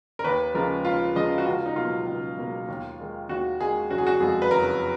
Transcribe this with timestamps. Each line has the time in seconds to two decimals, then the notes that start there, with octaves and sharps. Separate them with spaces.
0.19 A#4
0.24 D#2 B4
0.54 C#3 F3 G#3 A#4
0.85 D#2 F4
1.15 C#3 F3 G#3 D#5
1.38 F#4
1.46 C#2 F4
1.66 D#4
1.76 B2 F#3 A#3 F4
2.07 C#2
2.38 B2 F#3 A#3
2.68 D#2
2.99 D#3 G#3
3.29 D#2 F#4
3.60 D#3 G#3 G#4
3.91 F#1 F#4
3.98 G#4
4.07 F#4
4.20 F2 F3 G#3 G#4
4.42 B4
4.51 F#1 A#4